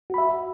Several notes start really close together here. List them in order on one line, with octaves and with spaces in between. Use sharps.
F#4 B5 E5